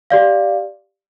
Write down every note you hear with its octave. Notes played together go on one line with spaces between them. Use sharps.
G4 D5 F5